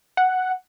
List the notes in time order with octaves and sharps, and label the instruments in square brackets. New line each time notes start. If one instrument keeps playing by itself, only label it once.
[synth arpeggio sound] F#5